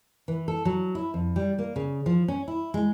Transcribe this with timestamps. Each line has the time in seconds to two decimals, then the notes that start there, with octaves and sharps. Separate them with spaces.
0.28 E3
0.48 A4
0.65 F#3
0.95 E4
1.14 F2
1.36 G3
1.59 A#3
1.76 C#3
2.06 F3
2.28 C#4
2.48 E4
2.74 G#3